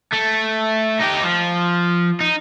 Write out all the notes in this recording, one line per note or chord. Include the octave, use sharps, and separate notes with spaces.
A3
D#4 G4
F3
D#4